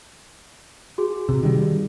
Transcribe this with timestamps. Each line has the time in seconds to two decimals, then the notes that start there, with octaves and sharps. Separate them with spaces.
0.98 F#4 G#4
1.29 C3
1.43 D#3 G3